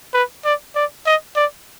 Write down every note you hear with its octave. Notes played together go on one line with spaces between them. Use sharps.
B4
D5
D5
D#5
D5